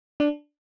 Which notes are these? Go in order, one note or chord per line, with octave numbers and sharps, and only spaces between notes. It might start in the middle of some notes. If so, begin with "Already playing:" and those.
D4